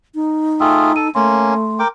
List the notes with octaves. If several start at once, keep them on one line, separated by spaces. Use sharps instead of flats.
D#4
A3 F4 G#4 G5 E6
A4 D#7
A3 A#3 C#4 C6
A#4 G5 D6